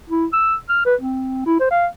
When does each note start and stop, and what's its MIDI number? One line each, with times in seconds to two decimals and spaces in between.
0.10 0.26 64
0.33 0.55 88
0.69 0.83 89
0.86 0.95 71
1.01 1.41 60
1.46 1.59 64
1.60 1.71 72
1.71 1.86 77